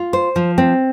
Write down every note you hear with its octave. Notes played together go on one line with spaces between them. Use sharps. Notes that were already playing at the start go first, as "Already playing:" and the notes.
Already playing: F4
C5
F3
C4